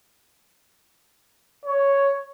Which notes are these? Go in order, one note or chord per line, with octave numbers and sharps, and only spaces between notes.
C#5